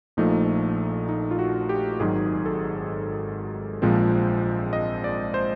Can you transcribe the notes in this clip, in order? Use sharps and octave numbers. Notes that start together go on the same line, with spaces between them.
A#1 A#2 F3 A3 D#4
D#4
F4
F#4
G4
G#1 G#2 D#3 F#3 G#4
A4
A#1 A#2 F3 G#3 C4
D#5
D5
C5